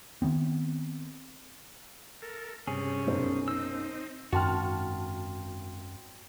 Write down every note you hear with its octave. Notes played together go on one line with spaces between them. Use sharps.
D#3 F#3 B3 C4
A4 A#4
G2 C3 C#4 G#4
B1 F#2 C5
C4 D#4 E6
G#1 F#2 F#4 G5 A5 C6 F6 A6